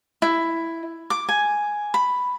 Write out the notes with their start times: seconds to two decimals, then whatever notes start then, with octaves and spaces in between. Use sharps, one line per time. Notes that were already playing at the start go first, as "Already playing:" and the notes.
0.22 E4
1.10 D6
1.29 G#5
1.94 B5